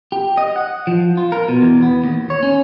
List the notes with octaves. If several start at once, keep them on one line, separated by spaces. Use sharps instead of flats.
G4
D#5
F#5
F3
F4
A#4
B2
E2
B3
D#2
C#5
C#4